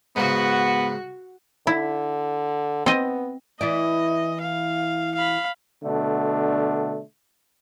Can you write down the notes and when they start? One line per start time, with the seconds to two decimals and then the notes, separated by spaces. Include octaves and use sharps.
0.16 G#2 C#3 B3 F#4
1.67 D3 E4
2.86 B3 C4 D#5
3.61 E3 E4 D5 D#5
4.41 F5
5.15 F5 B5
5.83 B2 D3 A3 D4